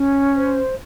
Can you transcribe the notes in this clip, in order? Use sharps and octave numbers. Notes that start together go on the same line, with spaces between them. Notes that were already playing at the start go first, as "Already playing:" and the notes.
Already playing: C#4
C5